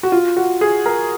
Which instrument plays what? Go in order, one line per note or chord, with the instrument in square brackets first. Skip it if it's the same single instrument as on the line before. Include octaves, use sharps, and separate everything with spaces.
[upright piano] F#4
F4
F#4
G#4
A#4